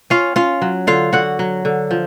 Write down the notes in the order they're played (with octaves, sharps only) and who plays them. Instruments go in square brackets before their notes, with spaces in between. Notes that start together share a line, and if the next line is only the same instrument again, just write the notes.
[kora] C#4 F4 F5
C#4 F4 F5
F#3
D3 F4 F5
D3 F#4 F#5
F#3
D3
F3